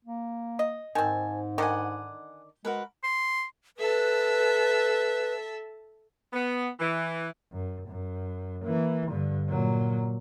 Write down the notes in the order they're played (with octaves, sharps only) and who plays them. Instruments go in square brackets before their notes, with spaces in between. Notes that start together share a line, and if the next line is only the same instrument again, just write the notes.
[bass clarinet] A#3
[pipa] D#5
[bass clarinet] G#2 [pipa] D#3 C4 [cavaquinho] G#5 A5
[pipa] D3 D#3 D5 [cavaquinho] D#5 F#5 G#5
[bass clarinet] G#3 [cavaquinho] F#4 A#4 B4
[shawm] C6
[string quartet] A4 E5 A5 [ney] B4
[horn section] B3
E3
[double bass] F#2
F#2
E3 A#3
G2 D3
A#2 F#3